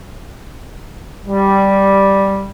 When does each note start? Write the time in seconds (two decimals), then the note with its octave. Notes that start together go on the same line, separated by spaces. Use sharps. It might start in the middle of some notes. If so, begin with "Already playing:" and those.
1.25 G3